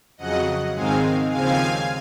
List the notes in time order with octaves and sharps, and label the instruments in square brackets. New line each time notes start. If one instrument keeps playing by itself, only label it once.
[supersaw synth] F2 C#3 F#3 D#5 F#5
G#2 D#3 G#3 C4 F5 G#5
D#2 C#3 F3 C4 F5 G#5